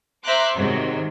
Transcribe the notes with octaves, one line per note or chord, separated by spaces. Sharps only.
C5 E5 A#5 C6 D6 F#6
G#2 C3 D#3 F#3